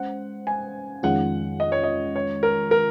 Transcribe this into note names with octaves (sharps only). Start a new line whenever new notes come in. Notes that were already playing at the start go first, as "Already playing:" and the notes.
Already playing: G#3 C#4 C5 F#5
G#5
F2 D#3 G#3 C#4 F4 F#5
D#5
C#5
D#5
C#5
A#4
A#4